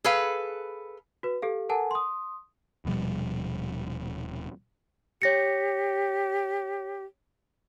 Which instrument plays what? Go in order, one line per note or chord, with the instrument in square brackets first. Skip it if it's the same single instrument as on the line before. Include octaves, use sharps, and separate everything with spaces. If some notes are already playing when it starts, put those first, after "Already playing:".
[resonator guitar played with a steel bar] G#4 A4 B4 F5
[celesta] F#4 B4
G4 A4 F5
A4 A#4 F#5 G#5 A5
C6 D#6
[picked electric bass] D#1 B2 F3 G3
[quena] G4 [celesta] C#5 A#6 C#7